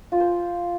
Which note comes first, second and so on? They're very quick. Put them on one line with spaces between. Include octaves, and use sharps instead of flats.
F4 G#5 C5